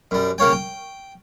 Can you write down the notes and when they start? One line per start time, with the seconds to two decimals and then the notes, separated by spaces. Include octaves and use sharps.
0.11 F#2 G3
0.38 C#3 A#3 C#5 G5
0.52 G5